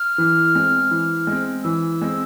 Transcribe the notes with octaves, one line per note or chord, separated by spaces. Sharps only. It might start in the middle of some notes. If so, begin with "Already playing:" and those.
Already playing: F6
E3
G#3 C4
E3
G#3
C4
E3 E6
G#3 C4